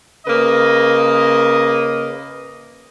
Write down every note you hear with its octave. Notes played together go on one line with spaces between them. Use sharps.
C#3 A#3 B4 D#5